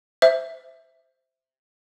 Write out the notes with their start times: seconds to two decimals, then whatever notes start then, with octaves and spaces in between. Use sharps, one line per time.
0.22 C5 E5